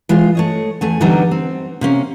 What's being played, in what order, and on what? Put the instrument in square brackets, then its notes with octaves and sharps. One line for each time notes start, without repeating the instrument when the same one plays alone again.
[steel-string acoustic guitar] E3 G#3 F4
A3 C#5 D#5
E2 A3 G#5
D3 E3 F#3 G3 B3 D#4
C4
C3 A#3 C#4